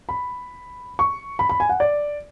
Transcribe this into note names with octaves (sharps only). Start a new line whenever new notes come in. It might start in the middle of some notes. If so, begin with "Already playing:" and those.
B5
C#6
B5
B5
G#5
F#5
D5